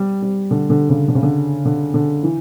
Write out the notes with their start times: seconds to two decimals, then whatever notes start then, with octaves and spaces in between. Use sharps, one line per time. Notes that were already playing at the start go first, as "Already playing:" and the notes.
Already playing: G3
0.22 G3
0.51 D3
0.70 D3
0.89 C#3
1.08 D3
1.15 C#3
1.23 D3
1.65 D3
1.94 D3
2.23 E3